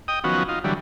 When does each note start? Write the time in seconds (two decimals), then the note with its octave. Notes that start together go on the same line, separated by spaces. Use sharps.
0.08 D#5 G5 D#6
0.24 D#3 F3 F#3 B3 C#4 F#4
0.49 D#4 F4
0.64 D3 E3 F#3 G3